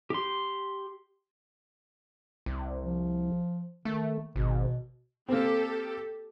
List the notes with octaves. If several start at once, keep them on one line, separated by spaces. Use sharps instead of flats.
G4 C6
C2
F3
D#3 A3
G#1 B2
A#3 C4 G4 A4